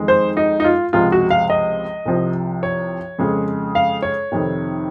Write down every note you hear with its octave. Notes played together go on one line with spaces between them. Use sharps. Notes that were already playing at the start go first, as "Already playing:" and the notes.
Already playing: F2 D#3 G#3
C5
D#4
D#4
F4
C#2 C3 F3 G#3 F4
F#4
F5
D#5
C2 C3 F3
C#5
F2 C#3 G#3
F5
C#5
F2 C3 D#3